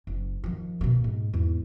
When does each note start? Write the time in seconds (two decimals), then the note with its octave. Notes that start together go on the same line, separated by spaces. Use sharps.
0.07 F#1
0.44 D#3 F3
0.81 B2 A#3
1.04 G#2
1.34 E2 G#2